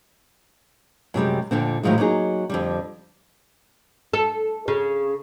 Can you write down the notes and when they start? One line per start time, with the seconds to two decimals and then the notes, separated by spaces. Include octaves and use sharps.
1.14 F#2 C3 G3 G#3
1.51 F2 A#2 D3 C4
1.83 A2 D#3 F3 F#3 G#3
1.98 F#3 A#3 B3 D#4 G#4
2.50 F2 D3 G3
4.13 A4
4.68 C#3